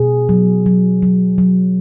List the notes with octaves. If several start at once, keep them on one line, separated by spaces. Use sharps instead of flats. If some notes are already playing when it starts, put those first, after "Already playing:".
Already playing: B2 G#4
F#3
F#3
F#3
F#3